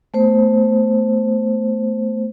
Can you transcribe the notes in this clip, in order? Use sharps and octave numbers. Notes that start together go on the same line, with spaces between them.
A3 B3 C5